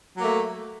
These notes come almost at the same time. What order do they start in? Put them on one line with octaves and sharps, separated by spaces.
F#3 A#3 A3